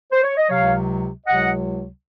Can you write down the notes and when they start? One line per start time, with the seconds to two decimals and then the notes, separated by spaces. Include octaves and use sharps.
0.12 C5
0.23 C#5
0.38 D#5
0.49 C#2 C3 F#3 C#5 F5
1.26 C#2 C3 F#3 D#5 F#5